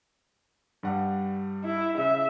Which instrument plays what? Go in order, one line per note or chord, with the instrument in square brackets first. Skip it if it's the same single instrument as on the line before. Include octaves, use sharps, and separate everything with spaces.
[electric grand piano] G2 G3 F#5
[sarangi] E4
[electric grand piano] C#3 [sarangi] E5